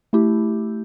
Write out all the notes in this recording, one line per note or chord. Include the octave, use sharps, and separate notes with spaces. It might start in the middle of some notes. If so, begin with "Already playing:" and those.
A3 E4 G4